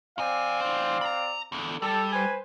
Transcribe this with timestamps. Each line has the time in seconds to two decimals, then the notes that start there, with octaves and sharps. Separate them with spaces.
0.18 F2 C4 D5 F5 G#5
0.61 E3 C5
1.01 A#5 B5
1.52 E2 D3
1.82 G3 A4
2.13 B4 C5 G#5